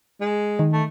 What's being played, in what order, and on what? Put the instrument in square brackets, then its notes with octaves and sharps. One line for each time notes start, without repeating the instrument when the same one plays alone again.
[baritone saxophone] G#3
[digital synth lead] D#3
[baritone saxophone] A3